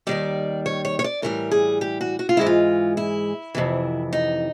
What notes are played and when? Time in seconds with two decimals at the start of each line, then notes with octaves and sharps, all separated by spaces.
0.07 D#2 D#3 G3 D5
0.66 C#5
0.85 C#5
0.99 C#5
1.04 D5
1.22 A2 E3 G3 A#4
1.51 G#4
1.81 G4
2.01 F#4
2.19 F#4
2.29 F4
2.37 G#2 E3 G#3 E4
2.46 F4
2.97 E4
3.55 F2 C3 E3
4.13 D#4